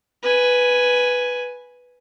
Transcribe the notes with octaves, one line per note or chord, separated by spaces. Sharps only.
B4 G#5